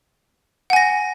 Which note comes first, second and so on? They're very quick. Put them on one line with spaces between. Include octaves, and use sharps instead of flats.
F#5 G#5 A#6